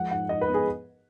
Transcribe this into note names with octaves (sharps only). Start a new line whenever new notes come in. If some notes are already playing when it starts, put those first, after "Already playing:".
Already playing: F3 G#3 F#5
G#2 F#5
G#2 D#5
B4
B3
G#4